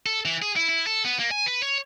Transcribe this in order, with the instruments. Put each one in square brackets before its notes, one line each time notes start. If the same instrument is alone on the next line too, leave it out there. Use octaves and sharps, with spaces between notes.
[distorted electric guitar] A4
E3
G#4
E4
E4
A4
B3
A#3
G#5
B4
C#5